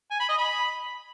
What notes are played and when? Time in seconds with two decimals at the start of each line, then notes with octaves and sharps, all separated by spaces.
0.11 G#5
0.20 B5
0.29 D#5
0.38 B5